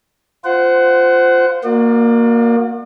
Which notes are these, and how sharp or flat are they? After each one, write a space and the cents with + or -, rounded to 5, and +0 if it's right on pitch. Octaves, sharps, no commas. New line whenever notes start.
F4 +0 C5 -15 F#5 +15
A#3 +0 F#4 -30 D5 +40